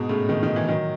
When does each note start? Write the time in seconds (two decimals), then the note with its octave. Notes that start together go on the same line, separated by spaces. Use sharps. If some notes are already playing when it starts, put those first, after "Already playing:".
Already playing: G#2 B2
0.09 A2 C#3
0.29 B2 D#3
0.43 B2 D#3
0.56 C#3 E3
0.69 D#3 F#3